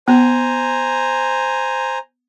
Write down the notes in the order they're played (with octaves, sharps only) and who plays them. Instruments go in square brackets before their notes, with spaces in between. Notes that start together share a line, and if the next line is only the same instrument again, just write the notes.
[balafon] B3 [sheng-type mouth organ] C5 G#5 A#5